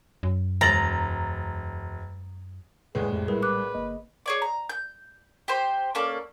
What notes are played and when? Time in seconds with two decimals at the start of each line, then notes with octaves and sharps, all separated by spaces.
0.23 F#2
0.61 E1 A#5 A6 F#7
2.95 A#1 A2 G#3 G#4 B4
3.11 F2 C3 A3
3.28 G3 E4 G#4 A#4 B4
3.42 B4 D6 F#6
3.74 G1 A#3 D#5
4.26 G#4 C#5 D5
4.42 A#5
4.70 G6
5.48 G4 C5
5.95 A#3 C#4 A4 D5